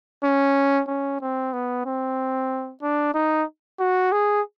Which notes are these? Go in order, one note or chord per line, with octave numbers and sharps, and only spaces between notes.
C#4
C#4
C4
B3
C4
D4
D#4
F#4
G#4